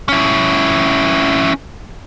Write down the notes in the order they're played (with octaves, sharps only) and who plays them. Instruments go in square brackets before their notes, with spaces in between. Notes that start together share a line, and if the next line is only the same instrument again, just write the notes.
[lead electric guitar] C#4 E4